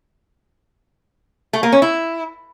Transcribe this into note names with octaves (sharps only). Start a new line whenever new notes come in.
A3
A#3
C#4
E4